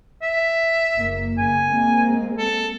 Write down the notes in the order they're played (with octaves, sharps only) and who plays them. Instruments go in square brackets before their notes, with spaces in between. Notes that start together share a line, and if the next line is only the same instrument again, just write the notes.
[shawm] E5
[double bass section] F#1 A#3
[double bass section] C#3 A#3 [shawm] G#5
[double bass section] G#3 A#3 C4
[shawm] A4